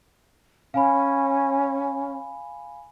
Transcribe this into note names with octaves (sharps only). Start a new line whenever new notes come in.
C#4 F5 G#5 B5